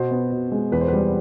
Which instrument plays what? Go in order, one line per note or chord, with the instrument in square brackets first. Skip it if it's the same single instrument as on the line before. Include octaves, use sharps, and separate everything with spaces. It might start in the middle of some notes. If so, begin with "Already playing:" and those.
Already playing: [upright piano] B2 C5
B3
B2
G#3
E2 B4
C5
G3 B4